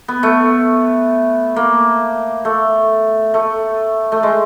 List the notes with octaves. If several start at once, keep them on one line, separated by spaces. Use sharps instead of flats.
B3
A3
A#3
A3
A3
A3
G#3